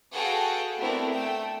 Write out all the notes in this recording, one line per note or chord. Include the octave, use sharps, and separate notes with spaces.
F#4 G#4 A4 B4 F5 G5
A3 B3 C4 D4 E4 A#4
A3 G5